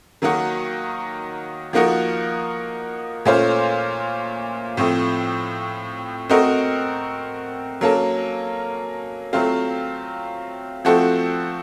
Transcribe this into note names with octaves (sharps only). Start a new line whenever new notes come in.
D#3 F#3 A#3 D#4 F#4
F3 A#3 D#4 F#4 A#4
A#2 A3 C#4 F4 C5
A2 F3 A3 C4
A3 C4 F#4 A#4 D#5
F#3 A#3 C#4 A4
F#3 A3 C4 F4
F3 A3 C4 F#4 A4